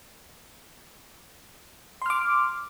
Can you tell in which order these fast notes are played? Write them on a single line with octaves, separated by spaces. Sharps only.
C6 F6 D6